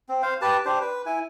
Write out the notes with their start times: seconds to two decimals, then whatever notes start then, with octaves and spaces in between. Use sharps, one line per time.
0.09 C4
0.22 C5 F5
0.42 G4 B4 A5
0.65 D4 G4 C5
0.81 B4
1.06 E4 G#5